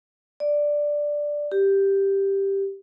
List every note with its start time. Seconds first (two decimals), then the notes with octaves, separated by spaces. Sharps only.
0.40 D5
1.52 G4